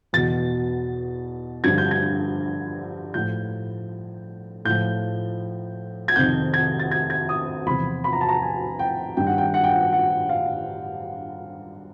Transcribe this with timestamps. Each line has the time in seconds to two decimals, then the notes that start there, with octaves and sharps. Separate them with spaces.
0.13 E2 B2 A6
1.64 G2 D3 F3 G#6
1.78 G6
1.91 G#6
3.14 A2 F3 G6
4.65 A2 F3 G6
6.08 G#6
6.16 F2 C3 D#3 G6
6.54 G#6
6.80 A6
6.91 G#6
7.10 G#6
7.29 D#6
7.66 E2 C3 F3 B5
8.04 B5
8.13 A#5
8.21 A5
8.29 A#5
8.42 G#5
8.79 G5
9.17 G2 D#3 G5
9.27 F#5
9.38 G5
9.54 F#5
9.64 G5
9.72 F#5
9.93 F#5
10.29 F5